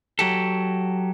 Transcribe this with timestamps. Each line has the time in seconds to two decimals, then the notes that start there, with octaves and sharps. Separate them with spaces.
0.19 F#3 G4 A4